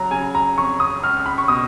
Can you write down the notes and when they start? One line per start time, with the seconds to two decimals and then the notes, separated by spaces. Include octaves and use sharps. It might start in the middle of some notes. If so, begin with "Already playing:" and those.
Already playing: C#3 F#3 A#5
0.11 C#3 G#5
0.35 A#5
0.58 F2 C#6
0.80 D#6
1.02 C#2 F6
1.26 B5
1.38 C#6
1.48 B2 D#6